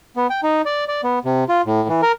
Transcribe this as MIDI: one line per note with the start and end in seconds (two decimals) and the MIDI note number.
0.16 0.27 59
0.30 0.41 79
0.43 0.62 63
0.65 0.85 74
0.88 1.01 74
1.04 1.19 59
1.25 1.44 48
1.49 1.62 65
1.66 1.88 45
1.89 2.01 52
2.02 2.12 70